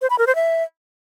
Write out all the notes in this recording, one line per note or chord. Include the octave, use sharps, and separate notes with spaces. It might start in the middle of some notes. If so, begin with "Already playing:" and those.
C5
B5
A#4
C5
E5